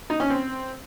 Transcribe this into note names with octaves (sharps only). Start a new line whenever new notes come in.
D#4
C#4
C4